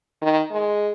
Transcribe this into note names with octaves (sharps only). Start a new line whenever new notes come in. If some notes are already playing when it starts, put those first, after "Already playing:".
D#3
G#3